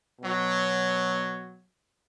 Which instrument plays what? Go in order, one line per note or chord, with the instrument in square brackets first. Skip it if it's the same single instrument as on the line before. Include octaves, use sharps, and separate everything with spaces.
[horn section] B2 F#3